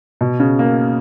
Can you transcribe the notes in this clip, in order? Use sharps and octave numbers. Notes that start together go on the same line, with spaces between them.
B2
C#3
A#3